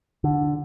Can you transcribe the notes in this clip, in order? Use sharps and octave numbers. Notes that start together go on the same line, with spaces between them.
D3